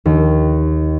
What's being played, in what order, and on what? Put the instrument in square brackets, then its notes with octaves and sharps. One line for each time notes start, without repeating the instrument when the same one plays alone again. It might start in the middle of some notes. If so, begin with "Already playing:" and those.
[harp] D#2